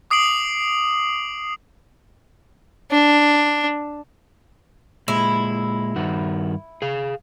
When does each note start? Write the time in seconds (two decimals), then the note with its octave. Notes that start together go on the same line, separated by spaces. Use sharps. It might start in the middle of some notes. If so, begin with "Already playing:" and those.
0.11 D6 D#6 C7 D7 F#7
2.91 D4
5.08 A#2 G#3 E4
5.96 G2 D#3 F#4
6.82 G#4 F5